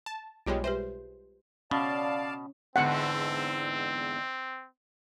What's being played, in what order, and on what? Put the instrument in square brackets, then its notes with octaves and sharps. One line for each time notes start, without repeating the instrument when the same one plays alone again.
[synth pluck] A5
[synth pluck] B1 G3 G#3 [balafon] F4 C#5 G5
[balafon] G4 B4 E5 [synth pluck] C5
[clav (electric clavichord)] B2 [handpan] C#4 [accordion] D5 F5 A5
[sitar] E2 G#2 D3 [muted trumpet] C4 [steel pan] F#5